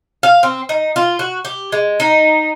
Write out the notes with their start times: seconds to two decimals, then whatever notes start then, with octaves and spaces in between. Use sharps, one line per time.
0.23 F5
0.43 C4
0.69 D#4
0.96 F4
1.19 F#4
1.45 G4
1.72 G#3
2.00 D#4